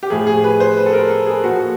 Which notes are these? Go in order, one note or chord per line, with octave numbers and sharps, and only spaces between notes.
G4
A2 F3 G#4
G#4
B4
C5
B4
A4
A#4
A4
G#4
A#2 F3 F#4